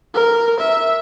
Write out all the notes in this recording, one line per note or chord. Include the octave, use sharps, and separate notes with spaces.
A#4
E5